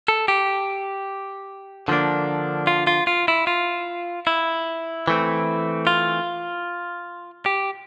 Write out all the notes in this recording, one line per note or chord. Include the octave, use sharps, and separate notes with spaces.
A4
G4
D3 F3 A#3 D4
F4
F4
F4
E4
F4
E4
E3 A3 C4
F4
G4